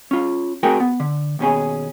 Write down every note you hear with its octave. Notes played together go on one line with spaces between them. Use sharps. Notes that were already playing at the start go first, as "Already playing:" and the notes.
C#4 F4
A3 C4 F#4 G#4 A#4 G5
B3
D3
D#2 B2 C#4 G#4